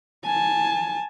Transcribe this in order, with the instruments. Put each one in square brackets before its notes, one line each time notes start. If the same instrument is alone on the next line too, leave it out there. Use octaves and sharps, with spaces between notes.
[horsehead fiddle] G#5 A5